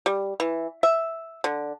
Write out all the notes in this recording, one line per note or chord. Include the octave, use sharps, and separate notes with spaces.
G3
E3
E5
D3